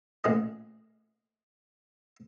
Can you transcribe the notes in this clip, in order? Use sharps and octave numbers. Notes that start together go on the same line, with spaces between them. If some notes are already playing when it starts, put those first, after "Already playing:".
A1 A#2 G#4 D#5